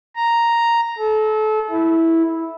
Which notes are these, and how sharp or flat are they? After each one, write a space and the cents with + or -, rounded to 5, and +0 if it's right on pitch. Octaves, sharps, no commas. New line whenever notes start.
A#5 +0
A4 -30
E4 -5